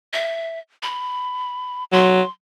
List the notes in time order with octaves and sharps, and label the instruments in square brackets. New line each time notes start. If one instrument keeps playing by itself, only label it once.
[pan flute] E5
B5
[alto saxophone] F#3 [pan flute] C6